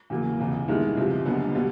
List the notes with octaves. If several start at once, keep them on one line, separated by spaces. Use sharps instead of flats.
E2 C#3 F#3 A#3
F1 E2 C#3
G2 D#3 G#3 B3 E4
C#2 C3 F3
F#1 F#2 D3 G3 B3
B2 G3 B3